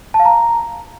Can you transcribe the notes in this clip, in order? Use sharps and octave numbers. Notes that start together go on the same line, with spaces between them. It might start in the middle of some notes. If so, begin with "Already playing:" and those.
A5
F5
A#5